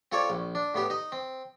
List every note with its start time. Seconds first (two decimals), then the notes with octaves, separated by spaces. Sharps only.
0.12 C4 F4 A4 C#5 D5
0.30 A#1
0.55 D4
0.74 A2 B3 G4
0.90 D#4 D#5
1.12 C4